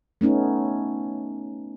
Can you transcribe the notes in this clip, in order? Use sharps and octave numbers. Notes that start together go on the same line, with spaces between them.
A3 B3 C#4 D#4